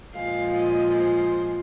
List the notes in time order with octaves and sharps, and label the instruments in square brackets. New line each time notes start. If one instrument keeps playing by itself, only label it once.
[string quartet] A#2 F3 G#3 F5
D#5
C5